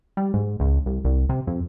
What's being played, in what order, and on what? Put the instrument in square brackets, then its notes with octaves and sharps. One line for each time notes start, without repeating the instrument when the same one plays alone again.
[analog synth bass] G3
G#2
C#2
C2
C2
C3
F2